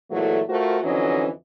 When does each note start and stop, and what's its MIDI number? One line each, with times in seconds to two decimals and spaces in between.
0.11 0.41 46
0.11 0.41 52
0.11 0.41 54
0.11 0.41 56
0.11 0.41 57
0.49 0.78 57
0.49 0.78 65
0.49 0.78 66
0.49 0.78 70
0.49 0.78 72
0.83 1.28 41
0.83 1.28 50
0.83 1.28 52
0.83 1.28 54
0.83 1.28 61
0.83 1.28 75